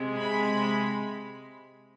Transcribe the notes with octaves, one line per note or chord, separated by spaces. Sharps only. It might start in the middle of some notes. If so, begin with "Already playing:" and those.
Already playing: C3 G#3
B5